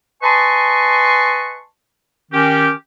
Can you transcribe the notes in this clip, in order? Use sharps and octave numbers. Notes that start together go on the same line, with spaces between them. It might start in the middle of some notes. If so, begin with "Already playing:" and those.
B4 D#5 G#5 A5 C6 C#6
D#3 C#4 G4